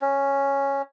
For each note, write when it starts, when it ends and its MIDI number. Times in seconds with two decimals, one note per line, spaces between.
0.02 0.82 61